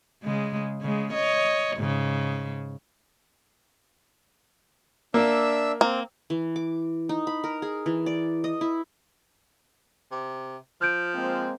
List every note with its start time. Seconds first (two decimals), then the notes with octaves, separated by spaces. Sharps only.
0.23 C#3 G#3
0.81 C#3 G#3
1.13 C#5 D#5
1.76 G#2 C#3
5.14 A#3 D4 E5 E6
5.81 A#3 C4
6.30 E3
6.56 D6
7.09 D#4
7.27 B5
7.44 A#4
7.62 G#4
7.86 E3
8.06 D5
8.44 D#5
8.61 E4
10.12 C3
10.81 F3 F6 G6 D7
11.15 G#3 A#3 C4